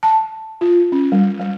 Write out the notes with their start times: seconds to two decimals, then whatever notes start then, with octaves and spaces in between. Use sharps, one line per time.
0.03 A5
0.61 F4
0.92 C#4
1.12 G3
1.40 G3